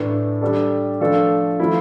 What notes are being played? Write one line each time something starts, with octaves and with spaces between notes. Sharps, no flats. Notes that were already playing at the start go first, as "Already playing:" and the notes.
Already playing: A2 E3 A3 D4
G3 D4 A4
F3 A3 D4 F4 A4
F3 A3 E4